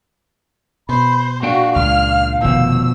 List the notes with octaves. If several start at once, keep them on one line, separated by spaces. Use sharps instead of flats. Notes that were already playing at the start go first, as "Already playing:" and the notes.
B2 C5 B5
A#2 D4 F#4 F5 G5
C#2 F6
F1 B2 D#3 F3 E6